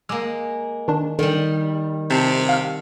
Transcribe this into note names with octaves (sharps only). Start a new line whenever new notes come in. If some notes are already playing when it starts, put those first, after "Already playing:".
G#3 A#3 D6 E6
D#3 D4
D3 D#3 G3
C3 A5
F5 F6